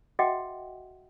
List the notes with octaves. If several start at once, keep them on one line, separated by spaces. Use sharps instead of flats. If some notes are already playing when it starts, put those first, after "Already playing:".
F#4 G#4 D#5 E5 F#5 G5